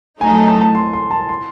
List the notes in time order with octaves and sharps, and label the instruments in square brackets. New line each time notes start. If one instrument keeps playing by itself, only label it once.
[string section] F#3 A3 D#4 [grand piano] G#5
[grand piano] A5
A5
A5
C6
C6
A5
C6